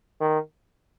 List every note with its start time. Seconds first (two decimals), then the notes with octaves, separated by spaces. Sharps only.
0.20 D#3